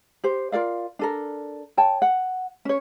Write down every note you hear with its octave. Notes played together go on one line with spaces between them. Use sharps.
G4 C5
F4 A#4 D5 F5
D4 A4 A#4
C#5 G5 A5
F#5
C#4 C#5